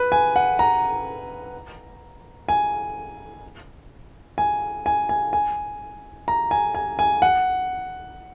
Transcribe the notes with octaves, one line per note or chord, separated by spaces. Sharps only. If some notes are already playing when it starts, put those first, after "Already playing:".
Already playing: B4
G#5
F#5
A#5
G#5
G#5
G#5
G#5
G#5
A#5
G#5
G#5
G#5
F#5